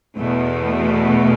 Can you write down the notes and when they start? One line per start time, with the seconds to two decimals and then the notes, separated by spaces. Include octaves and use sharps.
0.18 E2 B2 A3